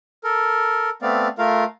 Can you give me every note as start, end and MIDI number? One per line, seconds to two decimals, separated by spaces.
0.24 0.90 69
0.24 0.90 70
1.02 1.28 57
1.02 1.28 59
1.02 1.28 60
1.02 1.28 74
1.02 1.28 77
1.38 1.64 57
1.38 1.64 65
1.38 1.64 70
1.38 1.64 77